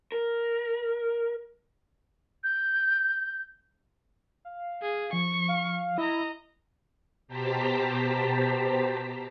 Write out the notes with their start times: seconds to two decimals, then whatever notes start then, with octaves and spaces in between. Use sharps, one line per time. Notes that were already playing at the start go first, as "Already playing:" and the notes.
0.12 A#4
2.44 G6
4.45 F5
4.82 G#4
5.13 F3 C#6
5.48 F5
5.98 E4 D#5 A#5 E6
7.28 B2 G4 C5 A5 A#5 B6